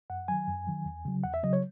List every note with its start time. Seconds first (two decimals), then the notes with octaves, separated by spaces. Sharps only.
0.10 F#2 F#5
0.28 D#3 F#3 G#5
0.48 F#2
0.67 D#3 F#3
0.85 E2
1.05 C#3 F#3
1.24 E2 F#5
1.34 E5
1.43 C#3 F#3 D#5
1.53 C#5